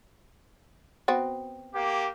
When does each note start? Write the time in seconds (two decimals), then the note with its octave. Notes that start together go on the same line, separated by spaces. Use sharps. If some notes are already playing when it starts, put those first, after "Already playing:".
1.08 B3 C4 F#4
1.75 A#3 G4